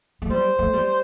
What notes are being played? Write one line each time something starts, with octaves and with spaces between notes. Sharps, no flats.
A3
G3 C5
A3
G3